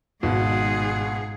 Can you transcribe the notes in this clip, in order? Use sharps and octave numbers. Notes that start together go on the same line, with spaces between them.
G#1 G#2 B2 F4 G#4 F#5